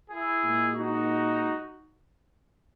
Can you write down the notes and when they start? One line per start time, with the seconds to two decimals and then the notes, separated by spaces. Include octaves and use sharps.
0.10 E4 G#4
0.43 A#2 G#3
0.73 D#4 F#4